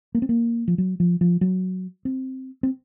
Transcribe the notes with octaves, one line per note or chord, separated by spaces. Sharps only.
A#3
C4
A#3
F3
F#3
F3
F3
F#3
C4
C4